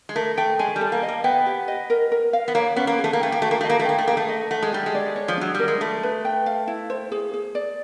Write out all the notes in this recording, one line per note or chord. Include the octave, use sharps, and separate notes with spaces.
G#3
A3 A#4
A3 G5
G#3 G#5
G3
A4
A#3
D#5
A#3
B3 G5
G4
D#5
A#4
A#4
F5
B3
A#3 C#5
B3 C#4
A#3
G#4
A3
A#3
A3 G5
A#3
A3 F#4
A#3
A3 D#5
A#3
A3
A#3 G5
A3
A#3 G#4
A3
D#5
A3 F#5
G#3
G3 G4
G#3
D5
C#5
F3
F#3 D4
G3 A#4
G#3
A3 B5
B4
G5
F5
E4
C5
G#4
G#4
D5